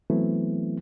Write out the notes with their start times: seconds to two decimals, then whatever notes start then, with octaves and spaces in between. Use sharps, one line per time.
0.10 E3 F#3 A3 B3 C4 E4